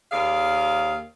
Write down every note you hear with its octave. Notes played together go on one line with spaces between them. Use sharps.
D#2 G#4 D5 F5